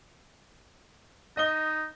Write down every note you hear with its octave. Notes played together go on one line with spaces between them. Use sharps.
D#4 D#5 G7